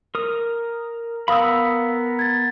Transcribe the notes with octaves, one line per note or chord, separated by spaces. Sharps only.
A#4 D#6
B3 A#4 F5 B5 D#6 E6
G#6 A6